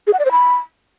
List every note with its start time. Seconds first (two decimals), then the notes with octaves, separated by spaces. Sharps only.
0.07 G#4
0.13 F#5
0.19 D5
0.25 C5
0.31 B5